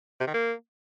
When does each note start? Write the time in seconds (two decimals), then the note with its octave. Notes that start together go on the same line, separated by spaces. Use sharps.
0.20 C3
0.27 D#3
0.34 A#3